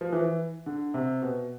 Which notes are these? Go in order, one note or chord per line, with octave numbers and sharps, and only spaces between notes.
F3
E3
D3
C3
B2